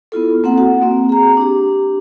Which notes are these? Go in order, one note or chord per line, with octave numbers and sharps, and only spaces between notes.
B3 E4 F4 A4
A#3 C4 A4 F#5
F#4 F#5
A#3 C4
G#4 A#5
D4 G4